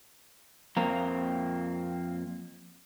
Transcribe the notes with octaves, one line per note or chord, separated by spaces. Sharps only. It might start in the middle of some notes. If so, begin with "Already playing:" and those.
F2 A#3 C4 A#5